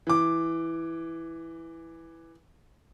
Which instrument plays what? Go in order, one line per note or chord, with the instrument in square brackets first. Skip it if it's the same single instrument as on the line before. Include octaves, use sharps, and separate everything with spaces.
[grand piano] E3 D6